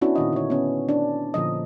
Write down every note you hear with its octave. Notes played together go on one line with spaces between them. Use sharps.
B3 C#4 D4 E4 F#4
A#2 D#3 D#5
D3 C#5
B3 C#4
D4
A#2 D3 F3 D#5